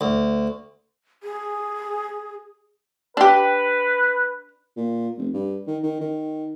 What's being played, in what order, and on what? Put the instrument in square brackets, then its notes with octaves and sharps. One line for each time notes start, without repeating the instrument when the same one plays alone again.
[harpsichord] D2
[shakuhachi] G#4
[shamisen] D4 G4 [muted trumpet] B4
[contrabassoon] A#2
F1
G2
D#3
D#3
D#3